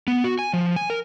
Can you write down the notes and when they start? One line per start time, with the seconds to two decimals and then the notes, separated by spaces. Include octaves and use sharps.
0.08 B3
0.24 F#4
0.39 G#5
0.53 F3
0.76 G#5
0.90 A#4